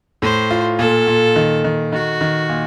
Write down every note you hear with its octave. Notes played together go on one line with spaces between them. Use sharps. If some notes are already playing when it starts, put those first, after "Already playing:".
A2 C5
F4
A#2 A4
A#2
D#3
D#3
D#3 F#4
D#3
A#2